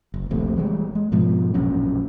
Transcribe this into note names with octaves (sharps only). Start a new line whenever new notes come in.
F#1
D#1 A#1 C3 A3
E3 G3 G#3
G#3
G#2 B2 F3
E1 A#1 F#2 C#4